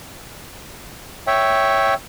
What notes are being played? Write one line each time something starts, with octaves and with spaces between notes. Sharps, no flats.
C#5 E5 G5